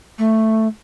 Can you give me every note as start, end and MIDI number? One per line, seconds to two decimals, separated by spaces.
0.19 0.68 57